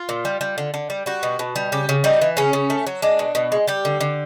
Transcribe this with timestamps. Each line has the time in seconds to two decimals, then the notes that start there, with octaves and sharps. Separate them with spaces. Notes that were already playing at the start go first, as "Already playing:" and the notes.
Already playing: F4
0.09 A#2
0.25 G3
0.41 G3
0.58 D3
0.74 D3
0.90 G3
1.06 G3 F#4
1.23 B2
1.39 B2
1.56 G3
1.72 C#3 G4
1.89 C#3
2.04 G3 D#4
2.22 E3
2.37 C#3 C#4
2.53 C#3
2.70 A3
2.87 F#3
3.02 G#3 D4
3.19 B2
3.35 B2
3.52 G#3
3.68 G3 G4
3.85 D3
4.01 D3